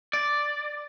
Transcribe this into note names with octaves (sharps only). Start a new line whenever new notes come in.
D5